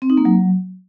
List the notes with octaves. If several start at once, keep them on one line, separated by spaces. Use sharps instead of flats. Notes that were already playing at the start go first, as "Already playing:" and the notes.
C4
D#4
A#3
F#3